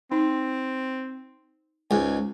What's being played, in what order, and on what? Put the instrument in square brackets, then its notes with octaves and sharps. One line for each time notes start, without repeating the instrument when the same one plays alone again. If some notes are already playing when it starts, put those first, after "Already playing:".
[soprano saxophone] C4 [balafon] D#4
[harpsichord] C#2 G#2 [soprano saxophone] G#5